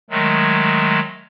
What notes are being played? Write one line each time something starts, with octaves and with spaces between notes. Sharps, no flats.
D#3 F#3 G#3 A3